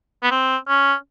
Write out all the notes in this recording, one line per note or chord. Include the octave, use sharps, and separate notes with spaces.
B3
C4
C#4